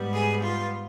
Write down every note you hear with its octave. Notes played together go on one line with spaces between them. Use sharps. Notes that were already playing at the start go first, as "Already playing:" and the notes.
Already playing: G#2 G3 B3
G#4
F4